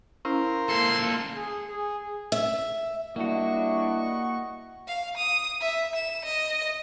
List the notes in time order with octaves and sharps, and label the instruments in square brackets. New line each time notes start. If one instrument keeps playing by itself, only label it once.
[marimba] C#4 E4 [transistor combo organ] A#4 C5 F5
[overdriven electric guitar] A#3 A4 [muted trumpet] C6
[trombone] G#4
G#4
[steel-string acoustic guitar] E5
[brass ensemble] G3 D4 E4 [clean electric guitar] A#3 F#4 [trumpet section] D#5 F#5 C#6
[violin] F5
D#6
E5
E7
D#5